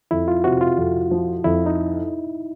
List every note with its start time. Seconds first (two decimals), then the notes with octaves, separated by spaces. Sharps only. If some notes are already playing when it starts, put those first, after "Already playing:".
0.11 F2 E4
0.28 F4
0.44 C3 F#4
0.61 F4
0.78 F2
1.11 F3
1.44 F2 E4
1.66 D#4